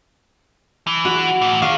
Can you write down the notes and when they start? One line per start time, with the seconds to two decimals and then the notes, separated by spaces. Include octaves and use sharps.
0.87 E3
1.05 F#4
1.42 A2 E3
1.62 D#3 F5